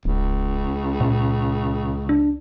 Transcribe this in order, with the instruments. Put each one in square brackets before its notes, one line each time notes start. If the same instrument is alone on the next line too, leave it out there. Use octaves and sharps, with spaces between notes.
[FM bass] D1 [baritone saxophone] C#2
[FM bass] A#2
D4